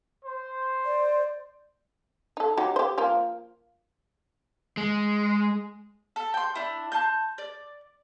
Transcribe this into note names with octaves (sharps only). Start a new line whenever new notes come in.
C5
D5
D#4 A4
F#3 D#4 G4
G4 C5
F3 A#3 F4
G#3
A4
G5 C6
D4 E4
A5 C6 G6
D5